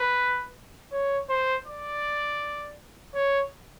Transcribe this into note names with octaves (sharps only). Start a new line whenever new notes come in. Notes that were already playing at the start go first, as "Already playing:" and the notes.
Already playing: B4
C#5
C5
D5
C#5